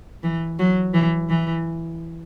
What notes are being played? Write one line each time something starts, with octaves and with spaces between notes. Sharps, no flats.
E3
F#3
E3
E3